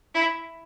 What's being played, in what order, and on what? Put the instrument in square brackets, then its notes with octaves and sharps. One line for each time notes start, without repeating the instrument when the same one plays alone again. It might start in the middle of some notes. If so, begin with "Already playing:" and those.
[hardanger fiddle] E4